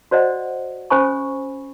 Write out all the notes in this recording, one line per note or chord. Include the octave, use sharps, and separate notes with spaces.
F#4 C5 D5 D#5 F#5
C#4 A4 C5 G#5 B5 C#6